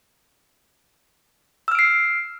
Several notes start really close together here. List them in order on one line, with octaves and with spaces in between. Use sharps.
E6 F6 D7 C7